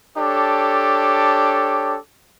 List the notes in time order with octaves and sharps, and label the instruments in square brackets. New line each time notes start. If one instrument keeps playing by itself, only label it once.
[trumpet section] D4 G4 A4 C#5 D6